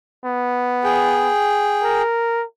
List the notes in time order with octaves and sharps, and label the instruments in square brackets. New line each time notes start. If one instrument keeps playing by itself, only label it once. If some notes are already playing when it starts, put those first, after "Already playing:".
[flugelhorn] B3
[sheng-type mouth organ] G#4 G5
[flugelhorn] A#4